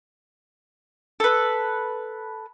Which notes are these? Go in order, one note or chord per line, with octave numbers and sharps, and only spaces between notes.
A4 B4